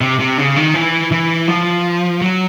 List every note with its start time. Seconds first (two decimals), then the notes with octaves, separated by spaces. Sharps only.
0.01 C3
0.19 C3
0.38 C#3
0.56 D#3
0.74 E3
1.12 E3
1.48 F3
2.21 F#3